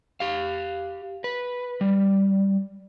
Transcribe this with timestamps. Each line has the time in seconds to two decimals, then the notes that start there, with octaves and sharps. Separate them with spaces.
0.20 G4 F5
1.24 B4
1.81 G3